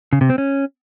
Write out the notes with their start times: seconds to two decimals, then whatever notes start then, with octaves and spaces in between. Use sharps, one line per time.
0.13 C#3
0.21 C3
0.30 C4
0.38 C#4